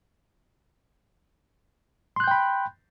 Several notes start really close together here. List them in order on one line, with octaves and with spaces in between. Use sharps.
C6 F#6 G6 G5 B5